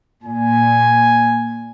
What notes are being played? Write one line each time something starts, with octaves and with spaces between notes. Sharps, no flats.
A#2 G#5